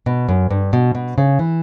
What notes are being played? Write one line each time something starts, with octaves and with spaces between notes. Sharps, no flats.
B2
F#2
G2
B2
B2
C#3
E3